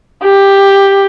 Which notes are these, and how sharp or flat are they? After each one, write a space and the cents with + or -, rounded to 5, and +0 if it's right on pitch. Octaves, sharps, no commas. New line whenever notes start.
G4 +10